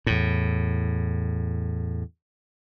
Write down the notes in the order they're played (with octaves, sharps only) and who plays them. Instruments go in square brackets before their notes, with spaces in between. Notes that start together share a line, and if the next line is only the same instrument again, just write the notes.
[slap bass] E2 A2